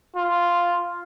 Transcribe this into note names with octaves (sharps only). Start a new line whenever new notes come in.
F4